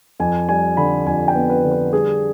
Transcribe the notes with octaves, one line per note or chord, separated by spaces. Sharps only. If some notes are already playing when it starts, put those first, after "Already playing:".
F2 G#5
G3 G#5
D3 B5
F2 G#5
G5
B3
B4
D3
B4
G3 G#4